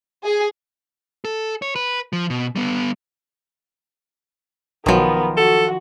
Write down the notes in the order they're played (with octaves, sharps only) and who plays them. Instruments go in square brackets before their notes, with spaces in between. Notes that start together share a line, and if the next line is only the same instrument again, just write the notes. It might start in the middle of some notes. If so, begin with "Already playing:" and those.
[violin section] G#4
[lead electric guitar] A4
C#5
B4
F3
B2
G3 B3
[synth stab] B1 F#3 [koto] D#3 F3 [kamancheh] B3 A#4
[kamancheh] F#4 [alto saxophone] A4